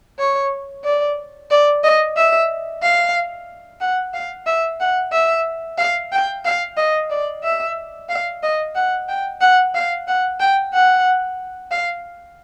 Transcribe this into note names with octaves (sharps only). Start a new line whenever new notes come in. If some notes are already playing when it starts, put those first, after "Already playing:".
C#5
D5
D5
D#5
E5
F5
F#5
F5
E5
F#5
E5
F5
G5
F5
D#5
D5
E5
F5
D#5
F#5
G5
F#5
F5
F#5
G5
F#5
F5